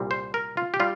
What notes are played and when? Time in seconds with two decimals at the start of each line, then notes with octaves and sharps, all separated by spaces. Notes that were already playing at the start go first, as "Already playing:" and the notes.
Already playing: C2 A#2 G3 C4
0.11 C5
0.34 A#4
0.57 F4
0.74 G4
0.80 G3 F4